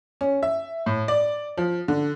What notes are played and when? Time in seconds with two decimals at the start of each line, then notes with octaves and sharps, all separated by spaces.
0.21 C#4
0.43 E5
0.86 A2
1.08 D5
1.57 F3
1.88 D3